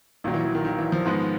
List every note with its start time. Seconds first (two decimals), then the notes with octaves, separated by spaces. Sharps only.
0.24 A#1 A#2 D#3 F#3
0.34 E3
0.44 E3
0.55 D#3
0.65 D#3
0.79 E3
0.92 F3
1.05 G#2 D#3 G#3 B3